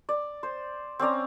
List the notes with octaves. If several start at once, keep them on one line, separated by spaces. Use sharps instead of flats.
D5
C5
C4 C#4 D5 A#5